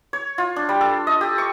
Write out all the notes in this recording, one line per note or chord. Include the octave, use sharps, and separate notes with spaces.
C#5
F4
D4
G3
A4
D#5
G4
C#6